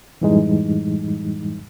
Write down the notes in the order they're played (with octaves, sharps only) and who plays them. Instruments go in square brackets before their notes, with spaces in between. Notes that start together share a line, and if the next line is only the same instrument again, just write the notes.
[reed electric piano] F#2 A2 E3 G3 G#3 D#4